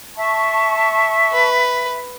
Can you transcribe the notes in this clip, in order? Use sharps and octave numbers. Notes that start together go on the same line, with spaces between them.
E5 A5 C#6
B4